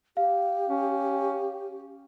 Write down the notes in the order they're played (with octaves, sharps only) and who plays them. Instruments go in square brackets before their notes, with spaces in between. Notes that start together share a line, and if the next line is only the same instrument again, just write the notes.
[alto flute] G4 [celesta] F5
[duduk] C#4